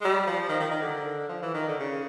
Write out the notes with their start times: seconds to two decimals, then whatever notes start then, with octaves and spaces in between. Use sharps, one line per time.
0.01 G#3
0.05 G3
0.27 F3
0.49 D#3
0.60 D#3
0.71 D#3
0.82 D3
1.29 F3
1.42 E3
1.54 D#3
1.68 D3
1.80 C#3